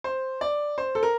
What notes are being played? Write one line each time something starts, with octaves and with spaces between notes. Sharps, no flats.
C5
D5
C5
A4
A#4